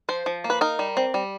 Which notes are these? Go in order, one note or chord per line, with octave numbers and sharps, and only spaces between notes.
F3 C5
F3
A#3
B4
D#4 A#4
G3
C4
G3